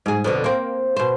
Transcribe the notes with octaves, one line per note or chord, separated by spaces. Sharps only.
G#2 G#4
F2 B2 D3
A#3 C4
B2 C5